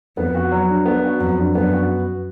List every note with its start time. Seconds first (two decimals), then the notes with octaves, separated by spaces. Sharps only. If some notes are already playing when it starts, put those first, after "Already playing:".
0.17 F2 B3
0.35 F#4
0.51 F#3
0.68 D4
0.85 B3
1.04 F#4
1.20 F2 F#3
1.38 D4
1.55 F#2 B3
1.73 F#4